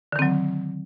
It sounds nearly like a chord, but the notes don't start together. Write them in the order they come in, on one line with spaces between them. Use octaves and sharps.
D3 D#3 C4 F#3